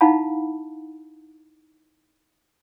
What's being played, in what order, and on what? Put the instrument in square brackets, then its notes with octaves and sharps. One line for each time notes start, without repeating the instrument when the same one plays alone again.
[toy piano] D#4 E4 F5 F#5 A5 B5